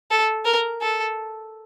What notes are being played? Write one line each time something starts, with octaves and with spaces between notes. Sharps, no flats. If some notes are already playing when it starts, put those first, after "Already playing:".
A4
A#4
A4